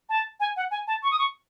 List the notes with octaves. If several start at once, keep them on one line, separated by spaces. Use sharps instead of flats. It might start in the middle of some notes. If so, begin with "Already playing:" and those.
A5
G#5
F#5
G#5
A5
C#6
D#6
C#6